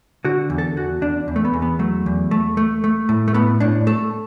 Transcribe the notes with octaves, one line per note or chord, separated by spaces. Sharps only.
D3 F#4
E2
A4
E2 F#4
E2 D4
E2
A3
B3
E2
B3
F#3 A3
E2
A3
A3
A3
A2
A3
A2 B3
A2 D4
A3 A4